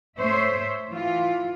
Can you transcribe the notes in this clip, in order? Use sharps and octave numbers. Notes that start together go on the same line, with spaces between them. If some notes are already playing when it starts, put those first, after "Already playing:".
A3 C5 C#5 E5
E3 F4